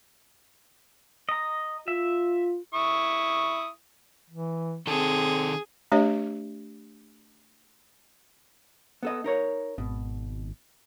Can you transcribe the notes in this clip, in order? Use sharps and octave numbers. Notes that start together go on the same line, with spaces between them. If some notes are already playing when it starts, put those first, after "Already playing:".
D#5 A#5
F4 E5
E4 C#6 D#6
E3
D#3 C4 G#4 A4
A3 D4 G4 C#5 D#5
B3 A4 D#5
D#4 A#4 C#5
G#1 B2